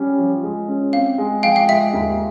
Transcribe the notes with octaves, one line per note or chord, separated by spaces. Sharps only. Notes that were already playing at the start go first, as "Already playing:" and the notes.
Already playing: G3 C#4
F3
G#3
C#4
C4 F5
G#3
F3 F5 G5
F5
G#3 E5
D#2